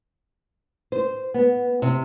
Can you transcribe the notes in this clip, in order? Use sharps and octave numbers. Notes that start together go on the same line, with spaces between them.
C5
B3
C3